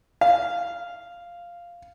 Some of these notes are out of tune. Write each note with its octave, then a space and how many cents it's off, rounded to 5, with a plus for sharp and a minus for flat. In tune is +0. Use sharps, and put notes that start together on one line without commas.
F5 -5